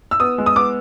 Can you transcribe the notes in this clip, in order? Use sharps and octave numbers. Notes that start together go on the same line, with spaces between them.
E6
B3 D#6
G#3
D#6
B3 D6